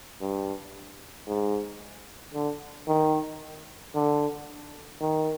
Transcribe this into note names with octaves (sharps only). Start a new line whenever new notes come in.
G2
G#2
D3
D#3
D3
D#3